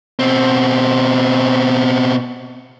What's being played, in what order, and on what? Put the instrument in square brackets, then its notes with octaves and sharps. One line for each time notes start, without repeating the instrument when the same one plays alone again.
[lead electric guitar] B2 C4